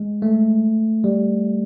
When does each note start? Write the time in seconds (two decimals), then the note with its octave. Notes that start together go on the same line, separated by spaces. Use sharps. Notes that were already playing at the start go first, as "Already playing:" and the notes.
Already playing: G#3
0.22 A3
1.04 G3